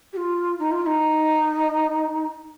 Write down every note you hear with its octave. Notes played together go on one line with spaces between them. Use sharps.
G4
F4
D#4
F4
F4
D#4